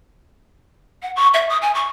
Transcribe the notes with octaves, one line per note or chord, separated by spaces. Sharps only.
F#5
C#6
E5
D#6
G#5
C#6